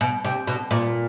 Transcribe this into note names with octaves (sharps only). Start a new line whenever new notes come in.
B2
C3
B2
A#2